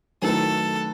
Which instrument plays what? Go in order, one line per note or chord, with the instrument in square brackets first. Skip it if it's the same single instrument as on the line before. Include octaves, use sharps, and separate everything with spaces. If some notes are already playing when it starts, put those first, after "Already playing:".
[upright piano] D#3 F#3 A3 E4 B4 [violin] A4